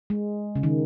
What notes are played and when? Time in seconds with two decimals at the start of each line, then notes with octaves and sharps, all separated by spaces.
0.10 G#3
0.56 C#3
0.63 D#3